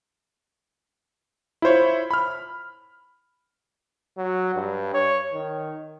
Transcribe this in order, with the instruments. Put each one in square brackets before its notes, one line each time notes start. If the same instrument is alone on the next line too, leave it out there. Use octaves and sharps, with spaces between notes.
[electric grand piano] E4 F4 C5 C#5
B5 F6
[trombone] F#3
G2
C#5
D#3